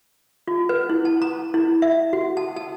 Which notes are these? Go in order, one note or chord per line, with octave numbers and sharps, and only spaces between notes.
F4
B4
E4
A5
A#5
E4
E5
F#4
A5
A5